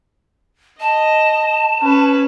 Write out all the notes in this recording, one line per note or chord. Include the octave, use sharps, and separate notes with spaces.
D#5 A5
C#4 B4